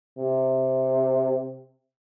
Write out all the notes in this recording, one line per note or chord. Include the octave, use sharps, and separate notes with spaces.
C3